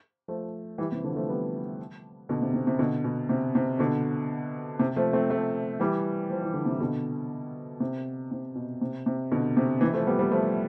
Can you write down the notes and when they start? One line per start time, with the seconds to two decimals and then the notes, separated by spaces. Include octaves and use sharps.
0.28 F3 A3
0.78 E3 G3
0.92 C3 E3
1.04 D3 F3
1.16 F3 A3
1.29 G3 B3
2.29 B2 D3
2.42 C3
2.54 C3
2.67 C3
2.79 B2 D3
3.04 B2
3.29 C3
3.55 C3
3.79 B2 D3
4.79 C3
4.96 F3 A3
5.13 A3 C4
5.30 F3 A3
5.80 E3 G3
6.30 F3
6.42 E3
6.54 D3
6.65 C3 E3
6.80 B2 D3
7.80 C3
8.31 C3
8.56 B2
8.81 C3
9.06 C3
9.32 B2 D3
9.57 C3
9.81 C3 E3
9.94 F3 A3
10.07 G3 B3
10.19 G3 B3
10.32 F3 A3